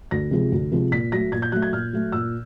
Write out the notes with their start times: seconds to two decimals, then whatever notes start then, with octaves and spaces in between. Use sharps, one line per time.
0.11 D2 A#6
0.31 C3 F3 G#3
0.52 D2
0.71 C3 F3 G#3
0.92 A#2 B6
1.12 F#3 A3 A#6
1.32 A#2 G#6
1.42 G6
1.52 F#3 A3 F#6
1.62 G#6
1.72 A#2 F6
1.93 F#3 A3
2.12 A#2 E6